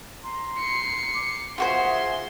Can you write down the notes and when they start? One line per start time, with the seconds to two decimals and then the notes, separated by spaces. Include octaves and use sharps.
0.23 A#5 C6
0.59 C7 C#7
1.13 D6
1.58 F4 F#4 G#4 C5 E5 C6